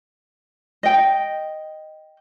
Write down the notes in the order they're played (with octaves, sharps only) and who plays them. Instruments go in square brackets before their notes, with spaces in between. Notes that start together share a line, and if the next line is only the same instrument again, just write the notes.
[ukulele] D#5 G5